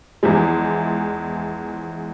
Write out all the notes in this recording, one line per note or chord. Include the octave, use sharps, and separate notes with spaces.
E2 E3 F3 G#3